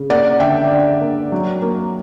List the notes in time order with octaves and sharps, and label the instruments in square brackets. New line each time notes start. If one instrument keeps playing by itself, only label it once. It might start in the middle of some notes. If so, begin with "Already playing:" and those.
Already playing: [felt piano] C#3
A#3 D5 F#5
D3 E5 G5
D3
A#3
F#3
A#3